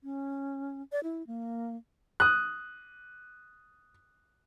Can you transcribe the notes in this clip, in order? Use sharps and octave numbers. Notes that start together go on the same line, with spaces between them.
C#4
D5
E4
A#3
D#6 F#6